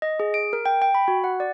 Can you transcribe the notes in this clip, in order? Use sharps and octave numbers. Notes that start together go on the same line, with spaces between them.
D#5
G#4
D7
A#4
G5
G5
B5
F#4
F#5
D5